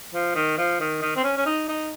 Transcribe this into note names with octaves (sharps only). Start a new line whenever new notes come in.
F3
D#3
F3
D#3
D#3
C4
C#4
C#4
D#4
D#4